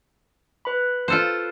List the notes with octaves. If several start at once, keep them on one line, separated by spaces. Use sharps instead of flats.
B4 B5
F4 A4 C5